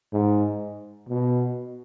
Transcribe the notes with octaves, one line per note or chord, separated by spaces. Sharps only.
G#2
B2